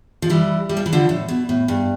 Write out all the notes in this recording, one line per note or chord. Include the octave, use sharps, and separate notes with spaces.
F3
E3 G3
G3
F3
E3
D3 F3
A2
B2
A2
G2